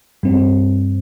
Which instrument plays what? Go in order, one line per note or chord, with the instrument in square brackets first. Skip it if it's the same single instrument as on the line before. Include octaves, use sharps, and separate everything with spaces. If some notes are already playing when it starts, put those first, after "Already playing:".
[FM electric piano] G2 G3 C4